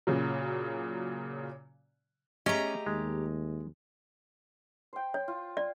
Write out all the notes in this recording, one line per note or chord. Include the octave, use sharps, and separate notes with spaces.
A#2 C#3 F#3
A3 C#4 G4 G#4 D#5 A#5
D#2 G#3
C5 G5
C#5
F4
D5